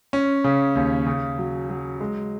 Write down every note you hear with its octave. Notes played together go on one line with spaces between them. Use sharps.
C#4
C#3
D#2
C#3
F#3
F#3
G#3